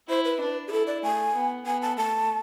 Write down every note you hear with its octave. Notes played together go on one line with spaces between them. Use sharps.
E4 C5
B4
D4
G#4
E4 A4
D5
A3 G#5
B3
B3 G#5
A5
A3 A5